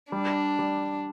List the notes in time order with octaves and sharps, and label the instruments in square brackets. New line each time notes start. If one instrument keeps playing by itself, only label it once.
[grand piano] G3 [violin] D4
[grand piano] G3